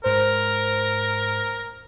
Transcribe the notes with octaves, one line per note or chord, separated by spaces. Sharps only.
G#2 A#4 C5